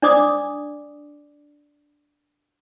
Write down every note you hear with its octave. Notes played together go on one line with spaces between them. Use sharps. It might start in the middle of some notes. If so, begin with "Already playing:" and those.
D4 D5 D6 D#6